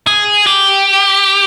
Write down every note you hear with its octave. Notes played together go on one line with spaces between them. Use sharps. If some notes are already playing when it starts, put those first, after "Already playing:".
G#4
G4